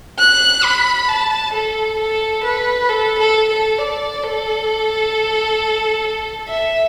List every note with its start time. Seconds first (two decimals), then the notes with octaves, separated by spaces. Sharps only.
0.19 F#6
0.64 B5
1.09 A5
1.53 A4
1.99 A4
2.44 B4
2.89 A4
3.19 A4
3.49 A4
3.79 D5
4.24 A4
6.49 E5